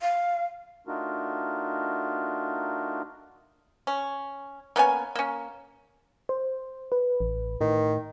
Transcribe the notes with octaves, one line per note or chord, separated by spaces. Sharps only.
F5
A3 D4 D#4 F4 F#4 A#4
C#4
A#3 B3 C#4 G#5
A#3 C#4
C5
B4
A1
A2 D#3